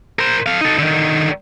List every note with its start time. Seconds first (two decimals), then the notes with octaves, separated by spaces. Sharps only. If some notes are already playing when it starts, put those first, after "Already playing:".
0.19 A#4 C5
0.46 A4 F5
0.61 D#4 A4
0.79 D3 D#3